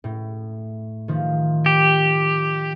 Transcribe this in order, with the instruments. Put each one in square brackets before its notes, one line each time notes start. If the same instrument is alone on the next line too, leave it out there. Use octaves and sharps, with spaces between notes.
[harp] A2
D#3 F3
[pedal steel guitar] G4